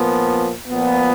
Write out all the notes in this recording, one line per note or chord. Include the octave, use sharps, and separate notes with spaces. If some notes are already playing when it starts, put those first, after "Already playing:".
Already playing: A#2 F3 B3
A#2 F3 B3